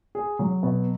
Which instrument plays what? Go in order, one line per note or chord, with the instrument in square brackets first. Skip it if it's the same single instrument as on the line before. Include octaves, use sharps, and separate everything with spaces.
[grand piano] G#4
F#3
B2